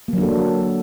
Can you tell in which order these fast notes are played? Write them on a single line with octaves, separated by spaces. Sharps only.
A#3 F#3 D4 A4